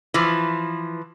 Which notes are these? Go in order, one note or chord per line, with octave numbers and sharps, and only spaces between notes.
E3 F3